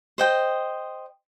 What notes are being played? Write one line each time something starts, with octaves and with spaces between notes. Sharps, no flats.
C5 D#5 G5